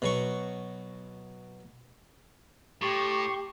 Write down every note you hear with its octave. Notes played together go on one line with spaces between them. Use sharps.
B2 F#3 C#6
A2 G4 C6 C#6